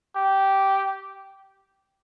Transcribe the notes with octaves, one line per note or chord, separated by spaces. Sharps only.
G4